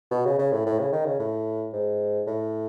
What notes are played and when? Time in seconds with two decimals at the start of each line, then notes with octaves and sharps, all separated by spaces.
0.11 B2
0.25 C#3
0.39 C#3
0.52 A2
0.66 A2
0.79 C#3
0.92 D#3
1.06 C#3
1.19 A2
1.73 G#2
2.27 A2